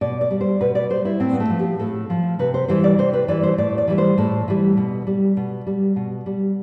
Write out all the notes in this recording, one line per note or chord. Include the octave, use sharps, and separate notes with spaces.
B2 D5
D5
G3
C5
B2 B4
D5
G3 C5
E4
A2 C4
B3
A3
F3
G4
A2 A4
F3
C3 B4
C5
E3 G3 C5
D5
C3 C5
B4
E3 G3 D5
C5
A2 D5
D5
E3 G3
C5
A2 A4
E3 G3
B2
G3
B2
G3
B2
G3